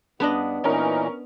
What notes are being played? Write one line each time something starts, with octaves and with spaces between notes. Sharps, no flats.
G2 B3 D4 D#5
A#2 E3 C#4 D#4 A#4